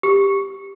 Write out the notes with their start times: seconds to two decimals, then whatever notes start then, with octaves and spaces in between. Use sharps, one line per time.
0.03 G4